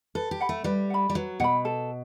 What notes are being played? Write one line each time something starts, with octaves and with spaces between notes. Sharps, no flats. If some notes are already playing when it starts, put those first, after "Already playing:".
A4 B4
G4
F#5 B5
A3
G3 B4
F#5 B5
G3
F#3 B4
B2 F#5 B5
A4